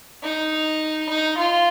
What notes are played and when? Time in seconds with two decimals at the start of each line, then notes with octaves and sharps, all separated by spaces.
0.23 D#4
1.09 D#4
1.38 F4